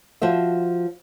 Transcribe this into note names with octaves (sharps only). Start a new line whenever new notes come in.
F3 F#4 C5 E5